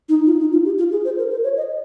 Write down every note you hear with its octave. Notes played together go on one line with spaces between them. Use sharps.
D#4
F4
D#4
F4
G4
F4
G#4
C5
A#4
C5
C#5
D#5